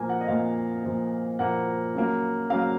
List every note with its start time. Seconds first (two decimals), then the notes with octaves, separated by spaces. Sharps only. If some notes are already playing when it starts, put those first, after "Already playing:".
Already playing: A#2 F3 A#3 G#5
0.09 F#5
0.21 D#5
0.28 A#2 F3 A#3 F5
0.84 A#2 F3 A#3
1.39 A#2 F3 A#3 F#5
1.95 C#3 F#3 A#3
2.49 C#3 F#3 A#3 F5